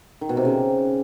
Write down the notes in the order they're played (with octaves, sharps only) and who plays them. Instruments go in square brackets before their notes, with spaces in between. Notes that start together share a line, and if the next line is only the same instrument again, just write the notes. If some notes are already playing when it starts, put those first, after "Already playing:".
[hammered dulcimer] D#3
B2
C3
C#3